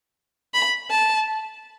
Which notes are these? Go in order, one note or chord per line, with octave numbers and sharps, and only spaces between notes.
B5
A5